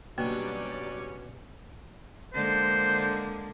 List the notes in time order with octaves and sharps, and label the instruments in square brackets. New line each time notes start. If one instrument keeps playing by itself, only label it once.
[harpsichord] B2 D4 [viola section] F#3 G3 D5 [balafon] A#3 [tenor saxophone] C#4
[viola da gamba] D3 G#3 A#3 [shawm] C5